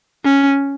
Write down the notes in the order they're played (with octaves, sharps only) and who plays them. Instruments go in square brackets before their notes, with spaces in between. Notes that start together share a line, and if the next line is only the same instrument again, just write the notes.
[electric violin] C#4